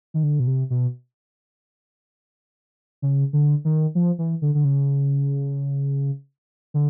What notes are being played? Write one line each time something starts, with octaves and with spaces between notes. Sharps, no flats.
D#3
D3
B2
C3
B2
C#3
D3
D#3
F3
E3
D3
D3
C#3
D3